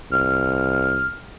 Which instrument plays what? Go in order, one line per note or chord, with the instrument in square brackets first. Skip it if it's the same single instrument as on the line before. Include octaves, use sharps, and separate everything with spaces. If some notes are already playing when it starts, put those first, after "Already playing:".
[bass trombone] C2 [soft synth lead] F6